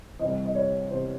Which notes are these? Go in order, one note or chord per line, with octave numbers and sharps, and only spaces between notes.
C2 C3 E3 D#5
D#5
C#5
C3 E3 C5